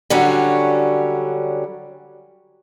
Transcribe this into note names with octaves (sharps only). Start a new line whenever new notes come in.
D3 F#3 G3 C#4